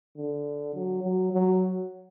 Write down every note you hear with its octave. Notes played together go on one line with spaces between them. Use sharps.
D3
F#3
F#3
F#3